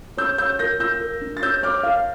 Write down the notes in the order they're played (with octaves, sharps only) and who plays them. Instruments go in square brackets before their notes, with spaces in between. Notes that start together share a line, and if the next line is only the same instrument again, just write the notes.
[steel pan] C#5 [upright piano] E6 G6
[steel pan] C#5 [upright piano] E6 G6
[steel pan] A#4 [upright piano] G6 A#6
[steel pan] F4 [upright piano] E6 G6
[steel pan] A#4
D4
[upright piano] A6
[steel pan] C#5 [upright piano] E6 G6
[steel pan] C#5 [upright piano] D6 F6
[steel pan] F5